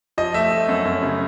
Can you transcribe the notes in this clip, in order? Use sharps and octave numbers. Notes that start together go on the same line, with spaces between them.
F3 D#5
A3 E5
A3
F#2
F#2
C#3